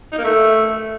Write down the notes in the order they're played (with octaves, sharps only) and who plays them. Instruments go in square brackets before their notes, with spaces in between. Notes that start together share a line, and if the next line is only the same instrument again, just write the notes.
[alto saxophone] D#4
A#3
A3